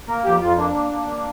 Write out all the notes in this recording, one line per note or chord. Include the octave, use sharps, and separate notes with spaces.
A#3 A#4
F2 G4
F2 F4
A#3 D4
A#3
A#3
A#3